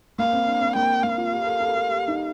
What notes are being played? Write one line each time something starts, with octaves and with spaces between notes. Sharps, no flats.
A#3 F5
C4
D4
C4
A#3 G5
A#3 F5
F4
G4
A4
A#4
A4
A#4
A4
G4
D#4